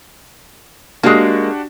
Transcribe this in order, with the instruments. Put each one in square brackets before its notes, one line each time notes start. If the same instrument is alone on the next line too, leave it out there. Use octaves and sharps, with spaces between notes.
[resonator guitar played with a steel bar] G#3 A#3 [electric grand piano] D4 F#4 G4